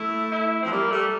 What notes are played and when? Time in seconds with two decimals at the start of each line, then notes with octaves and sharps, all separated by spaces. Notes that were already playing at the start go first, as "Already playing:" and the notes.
Already playing: A3 E4
0.32 E4
0.62 F3 C4
0.71 G3 A#3
0.92 G3 A3